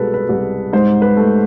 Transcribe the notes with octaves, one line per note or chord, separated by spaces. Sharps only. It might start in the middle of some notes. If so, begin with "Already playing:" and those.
Already playing: C2 B2 G#3 A4 B4
B4
C2
G#2 C5
B4
A3